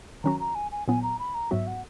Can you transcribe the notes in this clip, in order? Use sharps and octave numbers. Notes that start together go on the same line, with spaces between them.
D#3 F#3 C#4 F#4 A#5
A#5
G#5
G#5
A#2 F#3 B3 G#5
A#5
B5
A#5
G#2 F#3 B3 F#4 E5
F#5